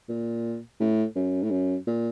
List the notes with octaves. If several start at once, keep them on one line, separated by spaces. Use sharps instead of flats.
A#2
A2
F#2
A2
F#2
A#2